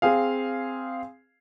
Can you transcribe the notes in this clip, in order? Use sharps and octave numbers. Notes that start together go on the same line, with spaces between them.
C4 G#4 F5